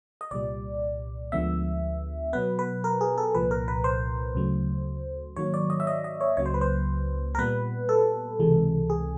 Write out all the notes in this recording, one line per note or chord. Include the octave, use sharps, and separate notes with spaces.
D#5
C2 A#2 G3 D5
D2 D3 F3 G#3 B3 E5
B2 F#3 B3 B4
B4
A#4
G#4
A4
C2 A#2 F3 B4
A#4
B4
C5
D2 C#3 F#3 A3
G#2 D#3 F#3 A#3 C#5
D5
D#5
E5
D#5
D#5
C#5
C#2 C#3 F#3 A#3 C#5
C5
B4
C5
A#4
A#2 G3 B3 B4
A4
C#2 C3 E3 G#3
G#4